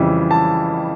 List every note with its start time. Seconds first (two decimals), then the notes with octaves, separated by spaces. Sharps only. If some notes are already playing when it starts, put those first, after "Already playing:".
Already playing: F2 C#3 E3 G3
0.31 A5